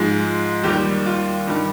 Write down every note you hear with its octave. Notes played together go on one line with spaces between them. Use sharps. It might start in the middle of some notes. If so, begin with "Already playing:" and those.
Already playing: G#2 F3 G#3
D#2 D#3 G3 G4
F4
G2 D#3 G3